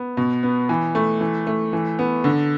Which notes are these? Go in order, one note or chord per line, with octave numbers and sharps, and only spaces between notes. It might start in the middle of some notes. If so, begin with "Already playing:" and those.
Already playing: B3
B2
B3
E3
A3
E3
A3
E3
B3
D3